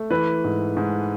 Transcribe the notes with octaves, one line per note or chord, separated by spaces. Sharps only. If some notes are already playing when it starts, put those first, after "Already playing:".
Already playing: A3
E3 B4
G#2
G#2